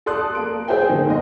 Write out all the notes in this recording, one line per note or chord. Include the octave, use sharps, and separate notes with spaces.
A4 D5 C6 D#6 F#6
A#3 D7
G#4 C5 D5 E5 G5 G#5
D3 A#3 D#4
G1 D#5